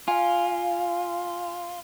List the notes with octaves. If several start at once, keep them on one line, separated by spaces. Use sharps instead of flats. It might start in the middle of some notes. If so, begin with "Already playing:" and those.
F4 F5 G#5